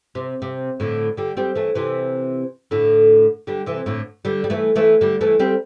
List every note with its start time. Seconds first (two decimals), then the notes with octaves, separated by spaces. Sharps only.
0.15 C3
0.42 C3
0.80 A2 D3
1.17 D3 G3
1.37 G3 C4
1.55 E3 A3
1.75 C3 E3
2.71 A2 D3
3.47 D3 G3
3.66 C3 E3
3.86 A2 D3
4.25 D3 G3
4.44 G3
4.50 E3 A3
4.76 E3 A3
5.01 D3 G3
5.21 E3 A3
5.39 G3 C4